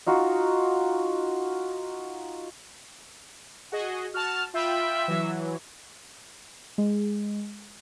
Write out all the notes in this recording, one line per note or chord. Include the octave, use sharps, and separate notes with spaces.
D#4 F4 F#4
F#4 G#4 D#5
F#4 A5 F6
F4 E5 G5 B5
E3 F#3
G#3